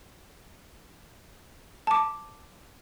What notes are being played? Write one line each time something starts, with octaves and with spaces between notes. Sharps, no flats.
A5 D6